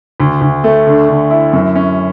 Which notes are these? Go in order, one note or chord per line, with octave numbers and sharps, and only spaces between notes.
D2
D2
A3
D3
D3
E4
F#2
C#4